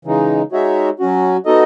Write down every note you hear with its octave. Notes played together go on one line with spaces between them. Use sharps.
C#3 E3 G#3 D#4
G#3 D#4 F#4 C#5 E5
F#3 C#4 F#4
B3 D#4 F#4 A4 D#5